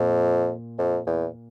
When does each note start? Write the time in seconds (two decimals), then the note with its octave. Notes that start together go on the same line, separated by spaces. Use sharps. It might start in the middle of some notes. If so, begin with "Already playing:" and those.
Already playing: F2 A#2
0.78 F2
1.06 E2